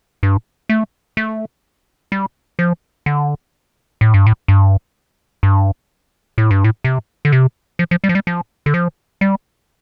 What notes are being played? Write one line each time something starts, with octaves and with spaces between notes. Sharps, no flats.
G2
A3
A3
G3
F3
D3
A2
G2
A2
G2
G2
A2
G2
A2
C3
D3
C3
F3
F3
G3
F3
G3
F3
D3
F3
G3